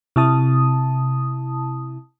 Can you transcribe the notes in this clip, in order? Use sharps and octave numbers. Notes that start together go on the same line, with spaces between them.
C3 E4 A5 D#6